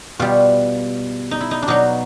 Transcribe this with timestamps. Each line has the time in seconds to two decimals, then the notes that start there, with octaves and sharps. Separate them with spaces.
0.19 B2 G3 F4
1.31 D#4
1.41 E4
1.51 D#4
1.62 D4
1.68 B2 F#3 D#4